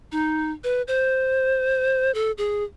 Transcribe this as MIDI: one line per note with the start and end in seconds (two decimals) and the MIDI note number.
0.12 0.52 63
0.64 0.82 71
0.88 2.14 72
2.14 2.32 69
2.38 2.63 68